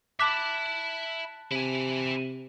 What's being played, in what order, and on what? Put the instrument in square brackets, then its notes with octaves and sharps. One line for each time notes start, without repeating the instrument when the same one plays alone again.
[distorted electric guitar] E5 B5 [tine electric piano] A5 F#6 B6 [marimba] D6
[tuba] C3 [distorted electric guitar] E4 G#5